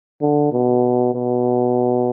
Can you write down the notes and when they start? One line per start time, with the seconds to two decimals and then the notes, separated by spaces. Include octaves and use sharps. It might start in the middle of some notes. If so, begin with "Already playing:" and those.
0.22 D3
0.52 B2
1.14 B2